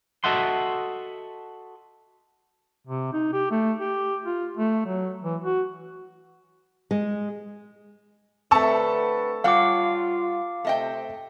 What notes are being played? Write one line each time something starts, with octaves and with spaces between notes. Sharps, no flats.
F#4 A4 D#5 E5 F#5 C6
C3
D#4
G4
A3
G4
F4
A3
F#3
E3
F#4
G#3
D3 A3 C4 B4 A5 C#6 E6
G3 F4 C#5 F5 F#5 D6
C3 A3 D#5 G5